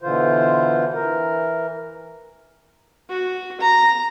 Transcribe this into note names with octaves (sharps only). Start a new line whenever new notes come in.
B2 D3 E3 F4 C5
E3 A#4
F#4
A#5